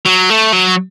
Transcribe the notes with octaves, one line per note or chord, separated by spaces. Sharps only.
F#3
A3
F#3